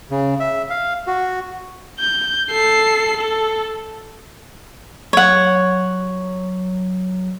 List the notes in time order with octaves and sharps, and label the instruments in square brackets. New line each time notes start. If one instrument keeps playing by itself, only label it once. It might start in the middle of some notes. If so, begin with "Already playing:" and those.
[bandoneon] C#3
E5
F5
F#4
[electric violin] G6
A4 C7
A4
[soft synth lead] F#3 [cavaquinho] C#5 F#5